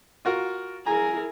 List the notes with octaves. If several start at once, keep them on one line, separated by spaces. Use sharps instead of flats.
F4 F#4 A#4
E4 G#4 A#4 G#5 A#5